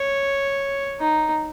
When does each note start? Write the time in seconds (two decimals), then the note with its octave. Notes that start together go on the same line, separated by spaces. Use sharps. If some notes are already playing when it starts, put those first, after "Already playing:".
Already playing: C#5
1.00 D#4